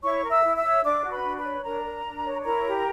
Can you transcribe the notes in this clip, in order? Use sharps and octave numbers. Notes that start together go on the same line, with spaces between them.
E4 C#5 C#6
A#4
E5 E6
E4
E5 E6
C#5
D4 D5 D6
F#4
B4 B5
D4
B4 B5
C#5
D4 A#4 A#5
A#4
D4
C#5
E4 A#4 A#5
G4